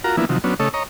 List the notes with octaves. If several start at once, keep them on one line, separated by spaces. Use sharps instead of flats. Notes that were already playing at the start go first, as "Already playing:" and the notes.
F4 F#4 A#4 A#5
E3 F3 A#3 B3 D4 E4
C3 D#3 F3 F#3
F#3 B3 C#4 D4
C#3 A3 A4 C#5 D#5 E6
C#5 D#5 A#5